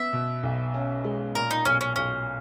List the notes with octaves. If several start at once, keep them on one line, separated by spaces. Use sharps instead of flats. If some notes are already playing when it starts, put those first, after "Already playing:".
Already playing: B3 E5
B2
B1
C#4
G#3
A#2 A#4
D#4
B1 C#4
C#4
B1 C#4